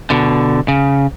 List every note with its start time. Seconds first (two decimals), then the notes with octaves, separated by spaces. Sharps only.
0.10 B2 D3
0.68 C#3